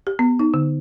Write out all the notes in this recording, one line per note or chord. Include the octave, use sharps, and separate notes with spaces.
G4
B3
D#4
D3